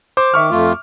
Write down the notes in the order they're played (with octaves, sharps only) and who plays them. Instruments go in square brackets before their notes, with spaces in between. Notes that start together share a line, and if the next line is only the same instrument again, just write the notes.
[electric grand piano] C5 [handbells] D6
[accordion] D#3 [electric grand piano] E5 C#6 F6
[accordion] F2 A3 F4